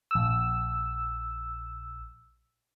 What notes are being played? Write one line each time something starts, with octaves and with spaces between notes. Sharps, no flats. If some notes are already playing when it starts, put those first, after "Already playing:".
A#1 E6